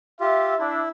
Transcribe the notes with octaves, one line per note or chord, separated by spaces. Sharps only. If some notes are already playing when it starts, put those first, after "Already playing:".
F4 G4 E5
D4 E4 E5